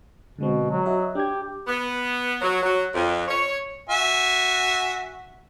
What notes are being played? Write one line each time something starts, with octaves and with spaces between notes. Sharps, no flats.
B2 D3 G#3 C4
F#3
F#4 D#5 E5
D4 G4 G#6
B3
F#3
F#3
F2
C#5
F#4 E5 G#5